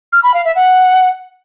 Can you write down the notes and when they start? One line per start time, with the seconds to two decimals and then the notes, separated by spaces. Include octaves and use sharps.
0.13 F6
0.23 B5
0.34 F5
0.45 E5
0.56 F#5